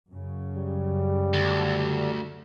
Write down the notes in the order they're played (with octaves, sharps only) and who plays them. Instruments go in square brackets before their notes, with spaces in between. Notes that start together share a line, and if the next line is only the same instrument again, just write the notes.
[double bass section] F#2 C#3
[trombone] G3
[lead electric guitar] D2 [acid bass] D3